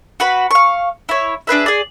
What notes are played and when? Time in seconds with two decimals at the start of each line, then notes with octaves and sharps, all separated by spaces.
0.20 F#4 B4 B5
0.51 F5 C#6
1.09 E4 C#5
1.47 D4 G#4 B4 E5
1.66 G#4 D5